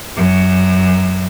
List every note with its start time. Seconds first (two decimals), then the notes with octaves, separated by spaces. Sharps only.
0.16 F#2